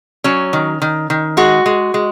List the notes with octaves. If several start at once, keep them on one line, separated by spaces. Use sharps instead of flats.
F#3 C#4
D#3
D#3
D#3
G#3 F#4
G#3
G#3